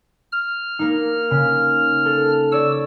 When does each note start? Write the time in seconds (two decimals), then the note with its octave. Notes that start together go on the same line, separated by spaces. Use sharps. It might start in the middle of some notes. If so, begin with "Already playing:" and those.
0.32 F6
0.79 A#3 D#4
1.31 C#3
2.05 A4
2.52 C#5 D5 E6